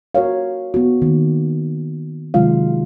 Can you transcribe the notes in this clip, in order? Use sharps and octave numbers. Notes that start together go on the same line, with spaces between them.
F#4 A#4 C#5 F5
B3 F#4
D#3 A#3
C3 D#3 F#3 G#3 F4 F5